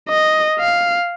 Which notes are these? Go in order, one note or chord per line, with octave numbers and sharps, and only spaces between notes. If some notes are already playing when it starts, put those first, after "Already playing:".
D#5
F5